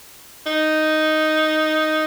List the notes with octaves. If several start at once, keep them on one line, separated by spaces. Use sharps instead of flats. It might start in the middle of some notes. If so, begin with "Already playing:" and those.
D#4